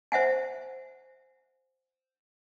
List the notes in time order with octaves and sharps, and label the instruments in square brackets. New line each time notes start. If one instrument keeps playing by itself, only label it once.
[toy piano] C5 E5 F#5 G#5